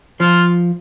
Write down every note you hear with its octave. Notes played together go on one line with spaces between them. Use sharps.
F3 F4